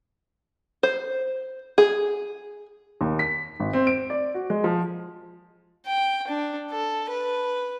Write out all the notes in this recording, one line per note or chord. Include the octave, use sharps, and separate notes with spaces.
C5
G#4
D#2
B6
G#1
C4
D7
D5
F#4
G#3
F3
G5
D4
A4
B4